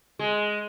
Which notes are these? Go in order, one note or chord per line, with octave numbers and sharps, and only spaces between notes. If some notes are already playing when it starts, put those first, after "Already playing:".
G#3